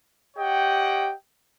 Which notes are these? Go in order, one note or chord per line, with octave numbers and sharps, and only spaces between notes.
G4 C#5 D#5 F#5 G5